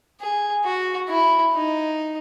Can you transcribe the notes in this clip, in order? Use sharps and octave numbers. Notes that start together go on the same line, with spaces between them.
G#4
F#4
E4
D#4